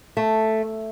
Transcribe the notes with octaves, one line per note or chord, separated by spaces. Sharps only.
A3